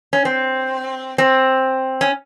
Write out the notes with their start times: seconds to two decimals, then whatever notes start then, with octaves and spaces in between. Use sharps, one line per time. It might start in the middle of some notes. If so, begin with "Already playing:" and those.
0.13 C#4
0.25 C4
1.18 C4
2.01 C#4